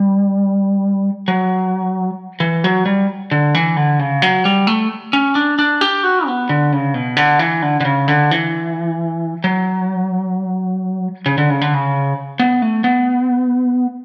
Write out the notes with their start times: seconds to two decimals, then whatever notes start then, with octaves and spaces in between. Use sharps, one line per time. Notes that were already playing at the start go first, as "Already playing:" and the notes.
Already playing: G3
1.28 F#3
2.40 E3
2.64 F#3
2.86 G3
3.31 D3
3.54 E3
3.77 D3
3.99 C#3
4.22 F#3
4.45 G3
4.67 A3
5.13 C#4
5.35 D4
5.59 D4
5.81 G4
6.03 F#4
6.27 B3
6.49 D3
6.72 C#3
6.94 B2
7.17 D3
7.39 E3
7.62 D3
7.81 D3
7.85 C#3
8.08 D3
8.31 E3
9.44 F#3
11.26 C#3
11.38 D3
11.50 C#3
11.61 D3
11.74 C#3
12.40 B3
12.62 A3
12.84 B3